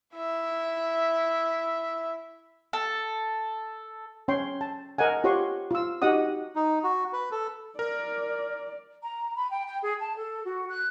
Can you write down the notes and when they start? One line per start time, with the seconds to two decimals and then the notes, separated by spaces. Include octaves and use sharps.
0.15 E4 E5
2.73 A4
4.28 C#4 C#5 G5 C6
4.61 A5
4.98 A#4 D#5 F#5 G#5
5.24 F4 G4 C#5 F#5 C6 C#6
5.71 F4 E6
6.02 D#4 F#4 G4 D#5 F#5 D#6
6.56 D#4
6.84 F#4
7.13 B4
7.32 A4
7.79 A#4 D5
9.03 A#5
9.36 B5
9.50 G5
9.67 G5
9.82 G#4
10.00 A5
10.16 A4
10.44 F#4
10.69 F#6